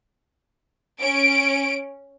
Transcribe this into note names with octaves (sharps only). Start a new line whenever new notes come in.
C#4 D7